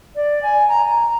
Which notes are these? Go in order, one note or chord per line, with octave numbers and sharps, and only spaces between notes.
D5
G#5
A#5
A#5